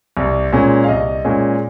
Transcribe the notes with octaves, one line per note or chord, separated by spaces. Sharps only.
C2
A#2 G#3 C#4
F5
C2 D#5
A#2 G#3 C#4